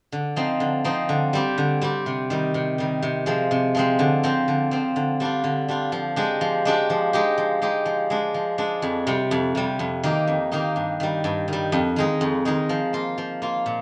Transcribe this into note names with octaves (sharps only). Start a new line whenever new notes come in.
D3
F3 C4 D#4
D3
F3 C4 D#4
D3
G3 C4 G4
D3
G3 C4 G4
C3
D#3 G3
C3
D#3 G3
C3
F3 G#3 C4
C3
F3 G#3 C4
D3
F3 C4
D3
F3 C4
D3
G3 D4 F4
D3
G3 D4 F4
F3
G#3 D4 G4
F3
G#3 D4 G4
F3
G#3 D#4 G4
F3
G#3 D#4 G4
F3
G#3 D4
F3
G#3 D4
F2
C3 G3
F2
C3 G3
F2
D#3 A#3 D#4 G4
F2
D#3 A#3 D#4 G4
G2
D#3 G3
G2
D#3 G3
F2
D#3 G#3 D#4
F2
D#3 G#3 D#4
F3
A#3 F4
F3
A#3 F4
A#2